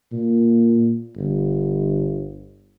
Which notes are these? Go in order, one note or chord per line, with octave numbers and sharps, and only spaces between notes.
A#2
G1